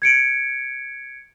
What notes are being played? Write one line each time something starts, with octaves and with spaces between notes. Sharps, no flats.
G#6 C#7 D7